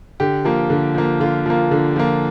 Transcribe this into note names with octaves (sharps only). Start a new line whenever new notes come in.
D3 G4
F3 A#3
D3
F3 A#3
D3 F4
F3 A#3
D3
F3 A#3